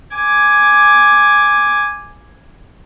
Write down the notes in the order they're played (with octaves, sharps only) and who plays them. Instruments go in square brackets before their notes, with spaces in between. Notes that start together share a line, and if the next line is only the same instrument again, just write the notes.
[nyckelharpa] G#5 D6